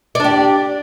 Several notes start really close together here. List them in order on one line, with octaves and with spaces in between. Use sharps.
D5 D4 G4